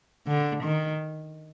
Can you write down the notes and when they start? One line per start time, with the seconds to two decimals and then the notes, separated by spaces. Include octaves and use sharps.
0.27 D3
0.63 D#3